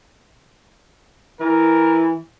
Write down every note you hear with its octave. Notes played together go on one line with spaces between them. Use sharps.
E3 A#4